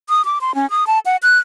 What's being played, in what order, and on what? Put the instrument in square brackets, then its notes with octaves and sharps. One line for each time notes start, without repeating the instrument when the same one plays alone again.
[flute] D#6
D6
C6
C#4
D#6
A5
F#5
F#6